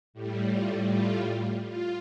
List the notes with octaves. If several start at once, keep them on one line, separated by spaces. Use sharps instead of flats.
A2 G3
F4
F4
F4